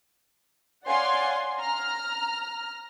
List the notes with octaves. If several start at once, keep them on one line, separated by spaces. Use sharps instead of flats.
C#5 D5 F5 F#5 G#5 C6
A#5 F6